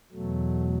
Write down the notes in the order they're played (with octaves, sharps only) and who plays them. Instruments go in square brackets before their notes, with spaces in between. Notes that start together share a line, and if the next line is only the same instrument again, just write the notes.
[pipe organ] E2 B2 F#3 A3